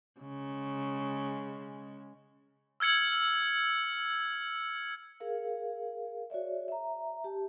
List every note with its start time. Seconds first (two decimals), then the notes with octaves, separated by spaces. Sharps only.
0.20 C#3 G#3
2.80 E6 F6 G#6 C#7 F#7
5.20 G#4 A#4 F5
6.30 F#4 C#5 D5 E5
6.68 E5 A#5
7.24 G4 A5